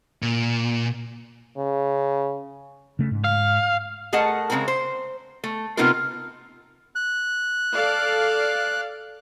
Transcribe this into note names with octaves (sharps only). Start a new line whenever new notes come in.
A#2
C#3
C#3 A3
G#2
F5
A3 G#4 A#4 D#5 F#5 A5
C#3 E3 G#3 C4 A#4
C5
A3
C3 B3 C4 D#4 F4 A#4
F#6
A4 D5 F5